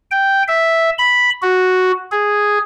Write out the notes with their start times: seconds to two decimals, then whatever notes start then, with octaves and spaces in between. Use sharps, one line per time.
0.11 G5
0.48 E5
0.98 B5
1.42 F#4
2.12 G#4